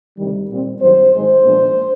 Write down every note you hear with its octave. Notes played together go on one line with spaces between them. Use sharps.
D2 C3 D#3 G3
A#2 G3 C4
G2 D#3 F#3 C5
G#2 D#3 G#3 C5
A#2 F3 G#3 B3 D4